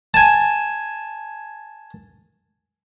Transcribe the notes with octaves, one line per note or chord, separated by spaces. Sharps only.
G#5 A5